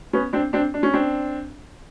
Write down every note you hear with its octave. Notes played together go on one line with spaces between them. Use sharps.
B3 C#4
C4 D4
C4 D4
D4
C#4
C4 D4